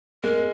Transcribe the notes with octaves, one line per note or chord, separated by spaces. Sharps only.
G#3 A#4